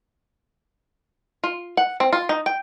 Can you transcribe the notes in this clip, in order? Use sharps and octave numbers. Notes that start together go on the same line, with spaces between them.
F4
F#5
C4
F4
D#4
G5